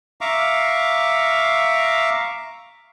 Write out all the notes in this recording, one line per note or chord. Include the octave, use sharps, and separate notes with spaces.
E5 F5 A#5 C#6 D6